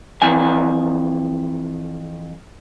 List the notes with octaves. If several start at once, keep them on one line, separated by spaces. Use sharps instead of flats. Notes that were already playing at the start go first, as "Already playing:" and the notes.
F2 E3 G#5